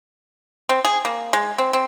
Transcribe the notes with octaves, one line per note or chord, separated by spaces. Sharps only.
C4
G#4
A#3
G#3
C4
C4